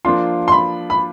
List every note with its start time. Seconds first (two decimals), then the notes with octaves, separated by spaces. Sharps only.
0.05 F3 A#3 D4 F4 C6
0.48 C6
0.52 B5
0.90 B5